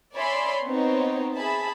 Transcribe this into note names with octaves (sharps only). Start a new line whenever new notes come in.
C#5 D5 E5 G#5 B5 C6
B3 C4 D#4 C5 C#5
G#4 E5 A5 B5